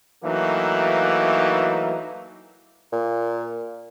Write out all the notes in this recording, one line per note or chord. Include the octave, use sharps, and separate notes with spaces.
E3 F#3 A3 A#3 D#4
A#2